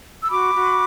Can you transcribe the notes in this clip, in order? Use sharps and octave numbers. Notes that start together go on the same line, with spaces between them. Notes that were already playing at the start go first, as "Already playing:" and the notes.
E6
F#4 B5 D6
F#4